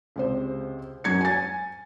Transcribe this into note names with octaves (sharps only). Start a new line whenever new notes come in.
C#2 C3 C5
F#2 F#3 G#6 C#7
G#5 A6